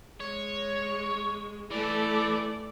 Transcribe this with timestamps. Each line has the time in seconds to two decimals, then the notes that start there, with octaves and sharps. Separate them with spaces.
0.20 G#3 C#5
1.71 E3 A3 D5